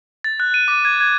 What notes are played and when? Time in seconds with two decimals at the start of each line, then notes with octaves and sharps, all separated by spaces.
0.24 A6
0.40 F#6
0.54 D#7
0.68 D6
0.85 G#6
1.00 G#6